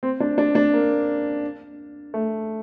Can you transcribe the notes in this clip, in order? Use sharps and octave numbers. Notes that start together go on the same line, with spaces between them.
C4
D4
D4
D4
A#3
A3